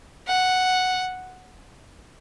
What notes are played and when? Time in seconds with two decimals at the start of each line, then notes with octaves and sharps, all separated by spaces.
0.27 F#5